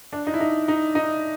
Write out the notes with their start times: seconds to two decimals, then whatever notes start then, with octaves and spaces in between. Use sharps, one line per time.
0.13 D4
0.27 D#4
0.34 E4
0.40 D#4
0.68 D#4
0.95 D#4